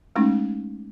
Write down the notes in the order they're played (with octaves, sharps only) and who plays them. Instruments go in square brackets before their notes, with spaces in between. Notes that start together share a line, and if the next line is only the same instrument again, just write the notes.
[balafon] G#3 A3 C#4 D#4